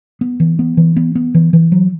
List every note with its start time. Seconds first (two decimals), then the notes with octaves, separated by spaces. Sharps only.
0.21 B3
0.40 E3
0.59 B3
0.77 E3
0.96 B3
1.15 B3
1.35 E3
1.53 E3
1.72 F#3